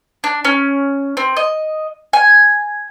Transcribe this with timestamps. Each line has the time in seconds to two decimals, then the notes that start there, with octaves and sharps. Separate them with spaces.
0.24 D4
0.45 C#4
1.17 C4
1.37 D#5
2.13 G#5